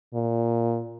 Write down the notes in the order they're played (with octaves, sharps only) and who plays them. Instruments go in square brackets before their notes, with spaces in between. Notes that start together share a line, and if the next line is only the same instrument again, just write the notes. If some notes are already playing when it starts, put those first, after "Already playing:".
[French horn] A#2